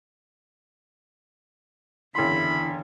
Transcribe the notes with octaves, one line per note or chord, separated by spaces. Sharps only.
F#1 E2 D3 E4 B5 C6